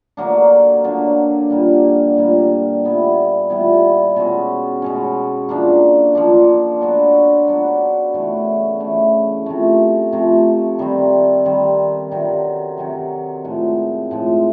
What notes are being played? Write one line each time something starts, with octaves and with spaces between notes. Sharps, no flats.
D3 F#3 A#3 D4
D3 F#3 A#3 D4
A#2 G3 A#3
A#2 G3 A#3
A#2 G3 B3 E4
A#2 G3 B3 E4
B2 G#3 C#4
B2 G#3 C#4
F3 A#3 D4
F3 A#3 D4
F#3 B3 D4 F#4
F#3 B3 D4 F#4
C#3 E3 A3
C#3 E3 A3
C3 F3 A3
C3 F3 A3
D#3 G3 C4
D#3 G3 C4
C3 D#3 F#3
C3 D#3 F#3
A2 F3 G#3
A2 F3 G#3